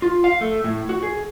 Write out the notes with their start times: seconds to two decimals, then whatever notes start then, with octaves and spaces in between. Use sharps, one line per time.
0.02 F4
0.24 F5
0.41 A3
0.64 A2
0.89 F#4
1.03 G#4